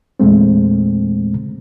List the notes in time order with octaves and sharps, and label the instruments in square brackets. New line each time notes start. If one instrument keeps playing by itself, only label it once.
[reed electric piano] E2 A#2 G#3 A3 C4